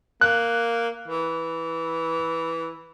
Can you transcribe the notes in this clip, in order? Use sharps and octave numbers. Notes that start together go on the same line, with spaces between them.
A#3 F#6
E3